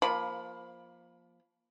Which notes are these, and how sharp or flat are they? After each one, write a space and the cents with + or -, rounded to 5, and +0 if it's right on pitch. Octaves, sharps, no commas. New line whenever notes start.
F3 +0 A#3 +20 B5 +0